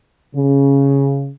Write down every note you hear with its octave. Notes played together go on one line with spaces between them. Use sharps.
C#3